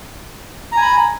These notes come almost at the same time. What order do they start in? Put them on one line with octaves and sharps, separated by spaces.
A#5 G#5 B5